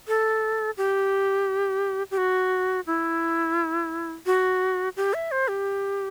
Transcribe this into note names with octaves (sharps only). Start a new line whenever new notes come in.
A4
G4
G4
F#4
E4
F#4
G4
E5
C5
G4